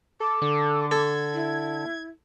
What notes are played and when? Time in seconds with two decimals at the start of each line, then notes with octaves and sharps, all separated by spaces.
0.20 A4 D6
0.42 D3 A4
0.91 A4 G#6
1.33 E4